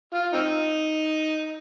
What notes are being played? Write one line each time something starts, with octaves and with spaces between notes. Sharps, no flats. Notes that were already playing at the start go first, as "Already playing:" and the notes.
F4
C4 D#4